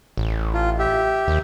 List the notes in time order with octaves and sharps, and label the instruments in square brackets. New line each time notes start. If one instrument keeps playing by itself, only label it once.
[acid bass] A1
[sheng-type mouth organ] F4
G4 E5
[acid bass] D#2